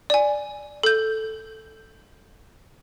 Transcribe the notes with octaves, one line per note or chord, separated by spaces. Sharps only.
D5 G#5
A4 G6